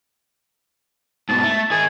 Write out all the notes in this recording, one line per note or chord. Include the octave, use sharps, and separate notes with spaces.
G#2 B2 A5
A3
D#3 G#4 G#5